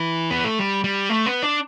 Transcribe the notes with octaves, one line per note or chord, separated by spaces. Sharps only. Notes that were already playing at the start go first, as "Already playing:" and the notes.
Already playing: E3
B3
A3
G3
G3
A3
B3
D4